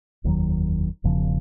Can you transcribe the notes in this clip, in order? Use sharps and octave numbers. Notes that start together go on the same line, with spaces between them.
F1 D#2 D#3 F#3
E1 E2 C#3 F3